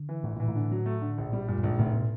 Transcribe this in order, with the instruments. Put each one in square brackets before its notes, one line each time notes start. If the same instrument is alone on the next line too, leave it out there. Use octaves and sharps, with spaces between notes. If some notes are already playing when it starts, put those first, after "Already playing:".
Already playing: [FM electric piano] D3
[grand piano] E3
[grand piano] G1 [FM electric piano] A2
[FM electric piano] A#2 [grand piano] E3
[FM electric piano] A2
[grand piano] D3
F#3
A3
D3
A#1
G3
[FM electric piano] G2 [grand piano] A#2
[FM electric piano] G2
[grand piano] A#1 [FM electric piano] G#2
[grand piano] F1 [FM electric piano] A2
[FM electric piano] B2